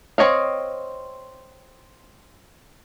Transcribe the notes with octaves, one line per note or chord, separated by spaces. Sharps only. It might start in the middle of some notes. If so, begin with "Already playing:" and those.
C4 D4 C#5 D#5 F5